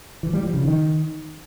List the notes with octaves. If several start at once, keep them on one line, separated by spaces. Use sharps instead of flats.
E3
G3
F3
C#3
D#3